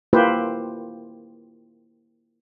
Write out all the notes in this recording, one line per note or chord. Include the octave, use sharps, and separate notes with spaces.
A#3 E4 F4 G4 B4 C5